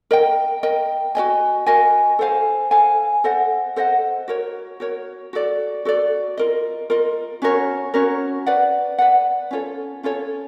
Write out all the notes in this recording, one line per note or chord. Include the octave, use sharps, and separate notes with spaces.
A#4 D#5 G5
A#4 D#5 G5
F#4 A#4 D#5 G#5
F#4 A#4 D#5 G#5
A4 C5 F5 G#5
A4 C5 F5 G#5
A4 C5 D#5 F#5
A4 C5 D#5 F#5
F#4 A#4 C#5
F#4 A#4 C#5
F#4 A4 D5
F#4 A4 D5
F4 A#4 D#5
F4 A#4 D#5
C#4 F#4 A#4 C#5
C#4 F#4 A#4 C#5
B4 D5 F#5
B4 D5 F#5
C#4 F4 A4 C#5
C#4 F4 A4 C#5